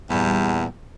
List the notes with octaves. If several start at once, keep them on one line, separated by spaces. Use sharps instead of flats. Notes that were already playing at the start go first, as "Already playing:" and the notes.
E2 A#2 G3 B3